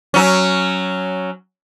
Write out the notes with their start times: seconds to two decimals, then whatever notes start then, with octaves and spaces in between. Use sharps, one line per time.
0.14 F#3 C#4